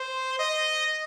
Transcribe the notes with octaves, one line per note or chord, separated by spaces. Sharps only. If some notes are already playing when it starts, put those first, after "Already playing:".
Already playing: C5
D#5